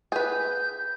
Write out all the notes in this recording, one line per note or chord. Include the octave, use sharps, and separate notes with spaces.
G#4 B4 G6